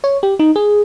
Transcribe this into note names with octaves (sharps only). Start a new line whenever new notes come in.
C#5
G4
D#4
G#4